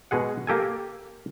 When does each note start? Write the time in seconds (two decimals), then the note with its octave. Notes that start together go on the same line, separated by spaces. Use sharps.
0.11 B2 G#3 G#4 F#5
0.47 A#3 G4 A4 G#5